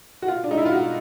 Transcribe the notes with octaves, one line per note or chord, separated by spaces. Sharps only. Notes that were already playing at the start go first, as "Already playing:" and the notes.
F#4
B2 F4
D4
G#3 D#4
E4
F4
B2 F#4